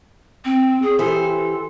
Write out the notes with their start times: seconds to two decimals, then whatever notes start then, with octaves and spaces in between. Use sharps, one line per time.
0.45 C4
0.82 G#4
0.99 E3 G4 A4 C5